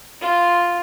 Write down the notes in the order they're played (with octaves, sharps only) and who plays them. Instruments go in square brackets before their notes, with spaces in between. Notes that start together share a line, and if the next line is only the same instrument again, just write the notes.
[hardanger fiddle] F4